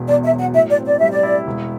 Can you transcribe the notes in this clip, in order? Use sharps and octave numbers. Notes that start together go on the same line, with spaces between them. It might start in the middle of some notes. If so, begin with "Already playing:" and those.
Already playing: E1 B2
E2 D5
E5
F#3
F#5
A2 E5
D5
C4
D5
G3 E5
D5
E4
E1